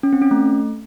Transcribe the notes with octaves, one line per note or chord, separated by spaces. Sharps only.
C#4
C4
C#4
A3